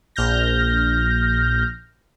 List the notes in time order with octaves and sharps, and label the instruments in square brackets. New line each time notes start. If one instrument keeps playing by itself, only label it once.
[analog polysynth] A#1 F6 G6 A#6